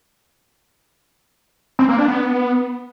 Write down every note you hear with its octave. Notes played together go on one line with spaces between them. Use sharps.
C4
A#3
D4
B3